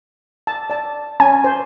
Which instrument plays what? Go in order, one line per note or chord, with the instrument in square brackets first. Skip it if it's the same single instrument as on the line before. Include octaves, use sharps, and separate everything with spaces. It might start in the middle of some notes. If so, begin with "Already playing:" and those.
[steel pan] A5
D5 A5
[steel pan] C#4 [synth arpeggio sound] G#5
[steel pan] C5